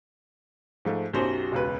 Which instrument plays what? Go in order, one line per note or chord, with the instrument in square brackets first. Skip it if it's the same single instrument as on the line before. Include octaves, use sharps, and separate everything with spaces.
[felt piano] G#2 F3 A3
[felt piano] B1 F#2 C5 [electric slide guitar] F#4 G4
[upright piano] E1 C#2 B4